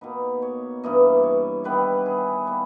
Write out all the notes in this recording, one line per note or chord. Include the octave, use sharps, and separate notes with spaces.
B2 A#3 D#4 B4
C#5
G2 E3 A#3 D#5
C#5
D#3 G3 B3 E4 B4
G#4
G3 A#3 G4